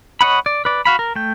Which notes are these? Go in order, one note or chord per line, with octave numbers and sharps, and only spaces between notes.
C#5 D#5 F#5 B5
D5
B4 D5
F#4 F5 B5
A#4
A3 G5